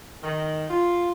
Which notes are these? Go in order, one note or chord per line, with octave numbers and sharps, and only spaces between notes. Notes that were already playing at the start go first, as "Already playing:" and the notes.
D#3
F4